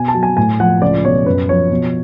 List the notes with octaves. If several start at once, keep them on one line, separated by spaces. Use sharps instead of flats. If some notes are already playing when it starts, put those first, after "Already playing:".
Already playing: B2 G#5
A5
F#3
G#5
A2 G#5
F3 F#5
C#2 D5
B2 C#5
F#2 B4
F3 C#5
B2